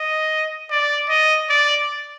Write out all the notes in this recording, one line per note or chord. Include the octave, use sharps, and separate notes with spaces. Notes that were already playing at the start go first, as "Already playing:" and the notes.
Already playing: D#5
D5
D#5
D5